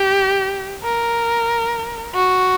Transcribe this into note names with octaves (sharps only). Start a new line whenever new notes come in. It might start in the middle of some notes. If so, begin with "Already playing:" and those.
Already playing: G4
A#4
F#4